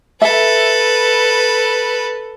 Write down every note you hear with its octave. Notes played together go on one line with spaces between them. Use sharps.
A4 B4 E5